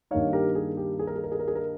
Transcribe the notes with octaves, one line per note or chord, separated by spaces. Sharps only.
G2 D#3 A#3 D#4 C#5 F5
G4 A#4
G#4
G4
G#4
A#4
G#4
A#4
G#4
A#4
G#4
A#4